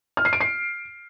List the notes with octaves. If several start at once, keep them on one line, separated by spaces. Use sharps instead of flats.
F6
C7
D7
C7